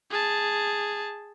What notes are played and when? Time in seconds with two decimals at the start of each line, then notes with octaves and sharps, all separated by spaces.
0.11 G#4 A5